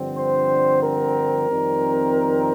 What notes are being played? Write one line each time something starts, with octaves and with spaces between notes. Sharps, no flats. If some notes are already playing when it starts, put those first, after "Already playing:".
Already playing: G2 D3 F3 C4
C5
A#4
F2 D#3 G3 C4